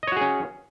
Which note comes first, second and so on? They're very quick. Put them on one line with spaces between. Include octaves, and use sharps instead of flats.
D#5 C#5 F#4 G#4 C#4